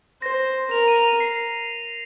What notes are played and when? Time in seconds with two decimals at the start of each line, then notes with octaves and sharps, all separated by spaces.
0.22 C5 A#6
0.71 A#4 F7
0.88 D#7
0.96 F7
1.08 D#7
1.20 C7